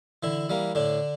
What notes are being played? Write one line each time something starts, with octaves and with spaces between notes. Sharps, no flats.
D3 E3 E4
G3 A#3
A2 D3 D4